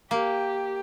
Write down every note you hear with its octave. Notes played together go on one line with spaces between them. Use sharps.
A#3 G4